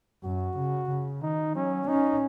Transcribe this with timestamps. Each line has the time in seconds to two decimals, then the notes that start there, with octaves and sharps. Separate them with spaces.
0.24 F#2 F#4
0.57 C#3
0.90 C#3
1.22 D#3 D#4
1.55 F#3 C#4
1.88 C#4 D#4